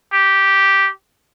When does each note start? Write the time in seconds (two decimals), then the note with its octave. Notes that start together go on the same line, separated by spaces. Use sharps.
0.13 G4